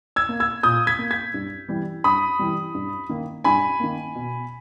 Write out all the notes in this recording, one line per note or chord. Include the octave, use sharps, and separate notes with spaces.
E6 G#6
A#3
E6 G#6
A#2 D#6 G6
G#6 B6
A#3
G#6 B6
G2
E3 G3
G2 B5 D#6
E3 G3
G2
D#3 A#3
G2 G#5 B5
D#3 A#3
B2